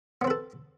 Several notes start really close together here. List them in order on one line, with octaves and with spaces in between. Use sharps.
B3 C4 B4 A4